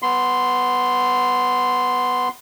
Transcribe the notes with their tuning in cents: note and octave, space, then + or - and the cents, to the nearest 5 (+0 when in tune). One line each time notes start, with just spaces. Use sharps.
B3 +0 C6 -5